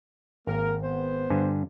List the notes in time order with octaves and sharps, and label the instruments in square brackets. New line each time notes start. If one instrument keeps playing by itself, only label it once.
[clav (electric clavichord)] G#1 [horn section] A#3 A#4
[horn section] B3 C5
[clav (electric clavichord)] G2 D3 G#5